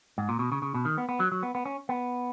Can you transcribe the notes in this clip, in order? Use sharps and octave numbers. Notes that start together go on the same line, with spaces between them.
G#2
A#2
B2
C#3
C#3
B2
D#3
B3
B3
F#3
F#3
B3
B3
C#4
B3